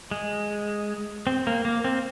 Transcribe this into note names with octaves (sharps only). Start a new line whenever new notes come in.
G#3
C4
A#3
A#3
C4